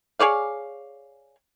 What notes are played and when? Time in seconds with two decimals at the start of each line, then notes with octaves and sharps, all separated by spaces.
0.19 G#4 C#5 D5 F5